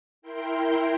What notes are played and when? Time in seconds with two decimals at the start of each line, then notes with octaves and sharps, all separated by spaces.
0.22 E4 A#4 G5 C6